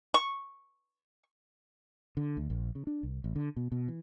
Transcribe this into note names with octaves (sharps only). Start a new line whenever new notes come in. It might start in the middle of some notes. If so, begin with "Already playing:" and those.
C#6
D3
D2
A#1
C#3
D4
C2
A1
D3
B2
B2
E3